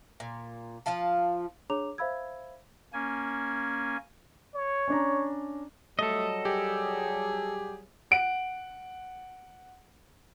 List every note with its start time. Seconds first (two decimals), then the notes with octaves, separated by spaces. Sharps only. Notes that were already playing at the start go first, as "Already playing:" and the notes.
0.20 A#2
0.86 F3 F4 F5 A5
1.70 D4 G#4 C#5 A#5 D6 F7
1.98 C5 E5 F5 B5 E6 G#6
2.93 A#3 C#4 G#5
4.54 C#5
4.88 C#4 D4 A#5
5.99 F#3 G3 A3 A4 D#5
6.45 G4 G#4
8.11 F#5 D7